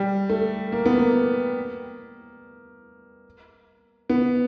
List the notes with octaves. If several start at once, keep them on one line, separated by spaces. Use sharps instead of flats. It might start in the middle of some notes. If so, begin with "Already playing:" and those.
Already playing: G3
A3
A#3
B3
A#3
B3